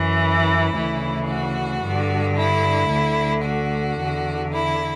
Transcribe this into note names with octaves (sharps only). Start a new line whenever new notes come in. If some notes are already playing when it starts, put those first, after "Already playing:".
Already playing: F#2 E3
E4
D2 C#3 E3
F#4
G2 D3
E4
D2 D3
F#4
E2 D3
E4